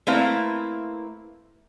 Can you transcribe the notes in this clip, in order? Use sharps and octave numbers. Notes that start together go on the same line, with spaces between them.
A3 A#3 C4 E4 B4 F5